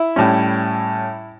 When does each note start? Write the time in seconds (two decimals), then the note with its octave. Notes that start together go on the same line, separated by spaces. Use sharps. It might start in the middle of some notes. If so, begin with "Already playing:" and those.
Already playing: E4
0.16 A2 G3 C#4